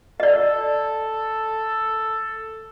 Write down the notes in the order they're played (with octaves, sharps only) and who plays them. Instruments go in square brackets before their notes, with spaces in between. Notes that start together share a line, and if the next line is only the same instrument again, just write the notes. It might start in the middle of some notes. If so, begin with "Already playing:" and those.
[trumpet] A4 [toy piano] D5 D#5